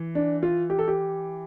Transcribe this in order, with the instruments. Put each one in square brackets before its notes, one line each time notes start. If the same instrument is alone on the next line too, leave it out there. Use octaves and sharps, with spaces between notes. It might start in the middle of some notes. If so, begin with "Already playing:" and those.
Already playing: [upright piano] E3
[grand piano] D4
F4
G4
A4
G4